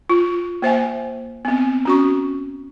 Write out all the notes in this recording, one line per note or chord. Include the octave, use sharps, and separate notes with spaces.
F4
A#3 C5 E5 G#5
B3 C4
C#4 F#4 C#6